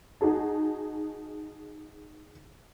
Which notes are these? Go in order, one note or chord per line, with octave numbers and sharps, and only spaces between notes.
D#4 F#4 G#4 A5